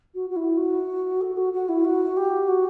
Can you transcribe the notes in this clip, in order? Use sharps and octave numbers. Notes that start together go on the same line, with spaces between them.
F#4
F#4
E4
F#4
A4
F#4
F#4
E4
F#4
G4
F#4